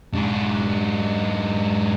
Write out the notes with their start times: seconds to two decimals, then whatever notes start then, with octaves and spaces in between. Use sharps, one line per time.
0.13 G#2 D4